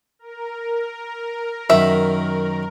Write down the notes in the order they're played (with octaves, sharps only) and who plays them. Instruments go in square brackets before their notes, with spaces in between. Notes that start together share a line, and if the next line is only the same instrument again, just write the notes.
[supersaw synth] A#4
[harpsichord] F#2 D#3 B5 [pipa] E5